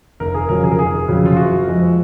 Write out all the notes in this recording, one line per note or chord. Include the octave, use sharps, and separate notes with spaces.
F1 A#4
G#4
F2 C#3 F#3 A#4
G#4
A#4
F1 G#4
F2 C#3 F#3
F4
F#1 F#4
F2 F3 G#3